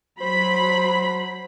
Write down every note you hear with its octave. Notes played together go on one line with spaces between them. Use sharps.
F#3 C5 B5